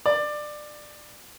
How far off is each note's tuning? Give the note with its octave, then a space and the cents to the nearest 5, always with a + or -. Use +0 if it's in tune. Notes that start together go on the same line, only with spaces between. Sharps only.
D5 +20